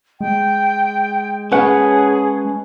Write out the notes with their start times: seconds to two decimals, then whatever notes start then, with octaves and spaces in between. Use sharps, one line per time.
0.21 G#3 G5
1.52 C#4 G#4 B4 C#5 F#5 A5